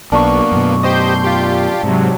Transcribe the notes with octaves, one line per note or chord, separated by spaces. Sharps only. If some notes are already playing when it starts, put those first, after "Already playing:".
B1 A#3 B3 D4 C#6
F#2 B2
G4 C5 D#5 C6 G6
F4 G4
G#2 C3 F#3